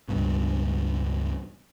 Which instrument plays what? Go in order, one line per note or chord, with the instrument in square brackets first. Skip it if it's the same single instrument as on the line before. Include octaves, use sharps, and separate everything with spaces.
[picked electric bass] C#2 G2 B2